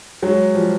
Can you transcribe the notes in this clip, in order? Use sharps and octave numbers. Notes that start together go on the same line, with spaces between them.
F#3 G#3
F3 G3